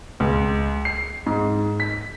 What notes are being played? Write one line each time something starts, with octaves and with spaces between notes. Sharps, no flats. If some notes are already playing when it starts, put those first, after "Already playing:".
C#2
C7
G#2
B6